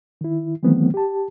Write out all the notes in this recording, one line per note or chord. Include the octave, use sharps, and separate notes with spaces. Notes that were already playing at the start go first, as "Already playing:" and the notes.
D#3 E4
D#3 E3 F#3 A3 B3 C4
G4 A5